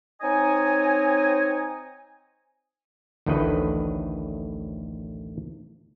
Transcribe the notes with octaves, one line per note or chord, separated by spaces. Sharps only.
C4 D#4 C#5 D#5 G#5
A1 D2 A2 D#3 B4 D#5